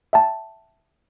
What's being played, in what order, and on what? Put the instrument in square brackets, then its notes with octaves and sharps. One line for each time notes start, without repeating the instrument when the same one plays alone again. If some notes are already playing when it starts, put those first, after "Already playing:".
[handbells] E5 G5 A5